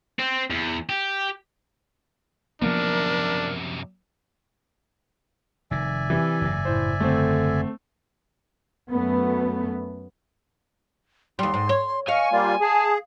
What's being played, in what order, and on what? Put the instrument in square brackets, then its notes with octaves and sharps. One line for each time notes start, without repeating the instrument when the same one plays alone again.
[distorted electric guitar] C4
E2
G4
[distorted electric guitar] F#2 C3 [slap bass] F3 A#3 B3 [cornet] D4 [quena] A#4
[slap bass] F1 D#3 [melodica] D5 E5 G#5
[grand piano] C3 E3
[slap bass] F#1 G#2
[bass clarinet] A2 [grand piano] C5
[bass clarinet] D3 [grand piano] A3 C4
[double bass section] F#2 A3 B3
[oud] D#2 G3 [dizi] C6
[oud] G#2
C#5
[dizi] D#5 [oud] F5 [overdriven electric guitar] G#5 [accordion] C#6
[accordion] G3 A#3 F4 [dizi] D5
[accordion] G#4 [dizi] A5